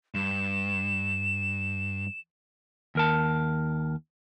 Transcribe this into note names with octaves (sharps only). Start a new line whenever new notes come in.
G2 E7
D#2 A#4 A5